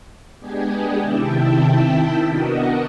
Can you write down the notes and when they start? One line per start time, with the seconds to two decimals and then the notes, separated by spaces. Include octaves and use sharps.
0.39 G#3 B3 D4 G4 G#4
0.98 C3 D#3 E4 E5 G5 A5
2.24 B3 D4 F#4 A#4 D#5 F#5